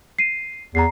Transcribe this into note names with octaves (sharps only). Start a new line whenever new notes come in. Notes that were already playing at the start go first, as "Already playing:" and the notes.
C7 D#7
E2 A#5 C7